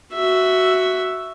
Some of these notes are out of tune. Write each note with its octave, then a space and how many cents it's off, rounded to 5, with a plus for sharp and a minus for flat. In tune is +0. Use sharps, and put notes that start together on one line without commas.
F#4 +5 E5 +0